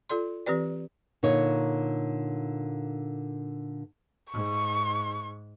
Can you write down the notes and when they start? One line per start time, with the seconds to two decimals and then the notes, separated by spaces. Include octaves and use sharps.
0.10 F4 A4 D5 C6
0.46 E3 C4 G4 B4 D5
1.23 A#2 D3 D#4 C#5
4.33 G#2 C#6